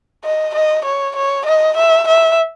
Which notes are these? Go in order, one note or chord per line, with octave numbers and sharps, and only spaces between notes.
D#5
D#5
C#5
C#5
D#5
E5
E5